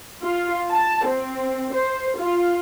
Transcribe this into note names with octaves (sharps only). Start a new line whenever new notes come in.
F4
A5
C4
C5
F4